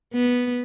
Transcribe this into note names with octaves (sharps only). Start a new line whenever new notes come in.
B3